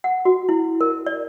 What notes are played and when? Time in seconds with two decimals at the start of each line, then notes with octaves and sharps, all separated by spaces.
0.04 F#5
0.25 F#4
0.49 E4
0.81 A#4
1.06 D5